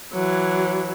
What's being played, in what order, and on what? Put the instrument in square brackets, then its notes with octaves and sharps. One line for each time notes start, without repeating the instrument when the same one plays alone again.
[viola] E3 F#3